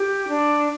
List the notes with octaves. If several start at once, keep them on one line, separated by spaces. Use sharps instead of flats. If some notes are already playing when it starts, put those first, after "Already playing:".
Already playing: G4
D4